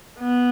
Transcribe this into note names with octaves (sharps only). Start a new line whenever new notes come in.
B3